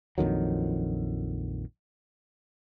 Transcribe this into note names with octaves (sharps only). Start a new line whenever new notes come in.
A#1 F2 D#3 F#3